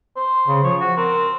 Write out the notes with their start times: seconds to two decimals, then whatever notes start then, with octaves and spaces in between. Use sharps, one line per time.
0.16 C5
0.48 C#3
0.64 F3 C#5
0.80 F#4
0.97 C4 A#4